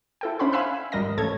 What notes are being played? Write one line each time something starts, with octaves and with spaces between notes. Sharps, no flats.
E4 A4 G5
C#4 D4 C5 F#5 B5 C6
E5 F5 G#5 B5 E6 F#6
G#1 G3 A#4 D#5 A#6
A1 A2 A4 C#5 G#6